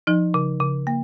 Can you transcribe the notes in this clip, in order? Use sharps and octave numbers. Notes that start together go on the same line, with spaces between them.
F3 D#4
C#3
C#3
A#3